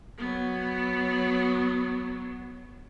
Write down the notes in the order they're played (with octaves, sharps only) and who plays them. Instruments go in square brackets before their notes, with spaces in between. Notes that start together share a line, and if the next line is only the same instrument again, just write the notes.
[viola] F#3 B3